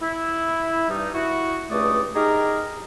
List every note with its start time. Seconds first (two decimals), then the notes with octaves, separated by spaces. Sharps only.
0.02 E4
0.89 G2 G3 D#4
1.14 E4 F#4
1.71 C#2 G2 A3 D5 D#6
2.16 D#4 G4 G#4 A#4 A#5